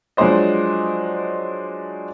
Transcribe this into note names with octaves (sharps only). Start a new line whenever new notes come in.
F3 F#3 G#3 D4 C5 D#5